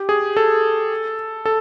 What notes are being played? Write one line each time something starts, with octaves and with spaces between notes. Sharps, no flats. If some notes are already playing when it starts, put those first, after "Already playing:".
Already playing: G4
G#4
A4
A4